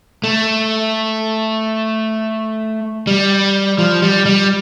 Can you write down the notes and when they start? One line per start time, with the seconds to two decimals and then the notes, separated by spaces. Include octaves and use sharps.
0.24 A3
3.07 G3
3.78 F3
4.02 G3
4.26 G3